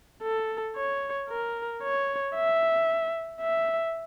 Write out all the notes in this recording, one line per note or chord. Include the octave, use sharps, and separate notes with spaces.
A4
C#5
A#4
C#5
E5
E5